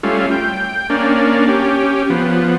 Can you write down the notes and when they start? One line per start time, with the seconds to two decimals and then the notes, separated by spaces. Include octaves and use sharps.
0.03 G3 A3 C#4 F4
0.31 G5
0.90 A#3 C#4 D4
1.48 C#4 G4
2.10 F3 B3